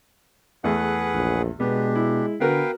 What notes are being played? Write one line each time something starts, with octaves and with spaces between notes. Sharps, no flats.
E2 A3 G#4 B4 F#5
A#1
B2 G#3 B3 D4 G4
E4
D3 B3 F#4 A#4 B4 F5 G5